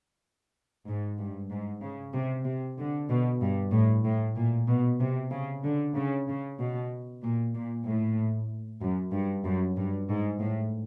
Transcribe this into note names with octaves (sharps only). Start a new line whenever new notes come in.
G#2
G2
G#2
C#3
C3
C3
D3
B2
G2
A2
A2
A#2
B2
C3
C#3
D3
C#3
C#3
B2
A#2
A#2
A2
F#2
G2
F#2
G2
G#2
A2